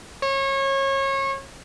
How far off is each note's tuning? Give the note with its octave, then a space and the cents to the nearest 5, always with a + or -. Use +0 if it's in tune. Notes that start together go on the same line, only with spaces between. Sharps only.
C#5 -30